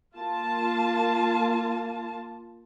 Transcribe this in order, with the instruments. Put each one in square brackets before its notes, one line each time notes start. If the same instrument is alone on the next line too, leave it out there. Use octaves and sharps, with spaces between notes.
[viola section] A#3 F4 A5